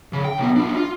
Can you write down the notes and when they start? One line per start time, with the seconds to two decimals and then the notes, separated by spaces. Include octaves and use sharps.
0.13 C#3
0.25 G5
0.38 B1 B3
0.56 D4 F4
0.76 F4